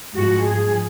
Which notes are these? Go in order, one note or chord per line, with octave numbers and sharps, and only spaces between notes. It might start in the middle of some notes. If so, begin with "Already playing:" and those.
G#2 F3 F#4
G#4